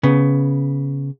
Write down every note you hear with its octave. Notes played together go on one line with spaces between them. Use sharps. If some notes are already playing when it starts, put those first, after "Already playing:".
C#3 B3